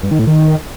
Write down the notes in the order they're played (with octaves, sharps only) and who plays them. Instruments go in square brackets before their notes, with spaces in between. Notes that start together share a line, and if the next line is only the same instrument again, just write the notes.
[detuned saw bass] G2
D#3
A2
D#3